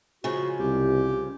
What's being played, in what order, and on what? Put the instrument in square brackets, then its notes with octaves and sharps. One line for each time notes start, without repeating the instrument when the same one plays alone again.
[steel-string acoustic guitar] C#3 F3 G#3 [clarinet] F#4
[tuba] C2 [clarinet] G4